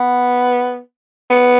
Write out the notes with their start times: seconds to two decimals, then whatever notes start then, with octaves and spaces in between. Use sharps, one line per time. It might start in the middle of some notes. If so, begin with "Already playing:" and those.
Already playing: B3
1.31 B3